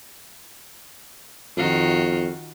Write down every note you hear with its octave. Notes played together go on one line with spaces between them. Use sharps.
F2 D#3 F4 F#4